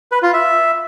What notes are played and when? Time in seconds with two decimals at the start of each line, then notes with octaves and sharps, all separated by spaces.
0.12 B4
0.23 F4
0.33 E5